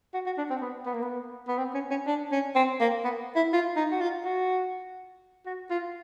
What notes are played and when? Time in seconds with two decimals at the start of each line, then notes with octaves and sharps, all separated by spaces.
0.14 F#4
0.26 F#4
0.38 D4
0.50 C4
0.62 B3
0.86 B3
0.94 A#3
1.02 B3
1.48 B3
1.58 C4
1.74 C#4
1.91 C#4
2.07 D4
2.32 C#4
2.55 C4
2.80 A#3
3.04 B3
3.36 E4
3.53 F4
3.76 D#4
3.92 F#4
4.01 F4
4.25 F#4
5.46 F#4
5.71 F4